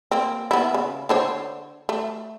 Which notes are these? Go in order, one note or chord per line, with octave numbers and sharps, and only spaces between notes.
A#3 C4
B3 E4
C#3
D3 C5 C#5
A3